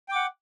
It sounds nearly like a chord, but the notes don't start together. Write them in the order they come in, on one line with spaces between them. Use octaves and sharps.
G5 D6 F#5